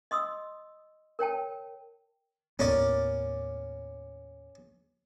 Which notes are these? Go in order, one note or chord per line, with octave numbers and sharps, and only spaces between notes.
D#5 C6 D#6 E6
A#4 C#5 G5 A5
D#2 A2 B3 C#4 A#4 D5